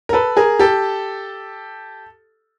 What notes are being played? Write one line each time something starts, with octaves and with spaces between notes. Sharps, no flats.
A#4
A4 B4
G#4 A#4
G4 A4